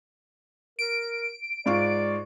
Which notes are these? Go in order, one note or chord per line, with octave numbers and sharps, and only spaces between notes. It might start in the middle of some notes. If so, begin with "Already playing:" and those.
A#4 D7
G#2 F4 D5 C#6